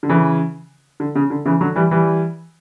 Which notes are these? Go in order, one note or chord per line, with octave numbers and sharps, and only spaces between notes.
D3
C#3 E3
D3
C#3
D3
C#3 E3
D3 F#3
E3 G3
E3 G3